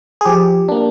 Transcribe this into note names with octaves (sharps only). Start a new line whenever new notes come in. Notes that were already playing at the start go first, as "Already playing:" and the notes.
G#4
F3 G4
A#3 D4